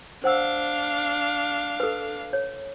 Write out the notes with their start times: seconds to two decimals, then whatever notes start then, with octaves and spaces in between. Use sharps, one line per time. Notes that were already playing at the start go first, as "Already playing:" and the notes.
0.24 D4 C5 F5 F#5 E6
1.80 A4 B4
2.33 C#5